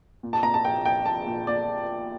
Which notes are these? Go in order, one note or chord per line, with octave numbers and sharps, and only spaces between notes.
A#2
A5
A#2 A#5
A5
A#1 G5
A#1 G5
A#1 A5
A#2
A#2 D5